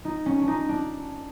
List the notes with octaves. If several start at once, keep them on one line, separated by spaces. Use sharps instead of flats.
D#4
C#4
D4
D#4
D4